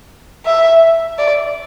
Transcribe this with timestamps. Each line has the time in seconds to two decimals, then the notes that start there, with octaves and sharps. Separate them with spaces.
0.46 E5
1.18 D5